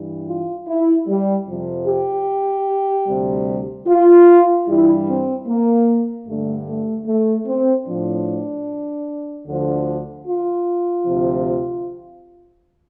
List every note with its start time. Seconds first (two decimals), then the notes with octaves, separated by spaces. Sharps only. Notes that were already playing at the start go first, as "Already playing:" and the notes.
Already playing: G2 E3 G3
0.27 F4
0.66 E4
1.07 G3
1.47 F2 C3 F3
1.86 G4
3.06 D2 C3 G3
3.86 F4
4.66 G2 E3 G3 E4
5.06 C4
5.46 A#3
6.26 G2 D3 G3 A3
6.66 A3
7.06 A3
7.46 C4
7.85 A2 F3 D4
9.46 D2 D3 F3
10.26 F4
11.05 D2 C3 F3